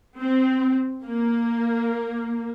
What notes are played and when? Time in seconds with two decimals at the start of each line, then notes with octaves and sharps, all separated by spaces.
0.18 C4
1.04 A#3